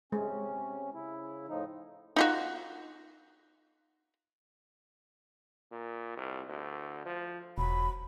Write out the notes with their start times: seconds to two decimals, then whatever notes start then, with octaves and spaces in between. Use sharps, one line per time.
0.12 C3 G#3 C#4
0.94 C#3 E4
1.48 A2 F3 D#4
2.16 D#4 F4 F#4
5.72 A#2
6.17 C2
6.49 D2
7.06 F3
7.58 E1 F#3 B5